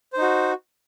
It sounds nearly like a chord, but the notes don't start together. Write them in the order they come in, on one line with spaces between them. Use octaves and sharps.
C5 D#4 F#4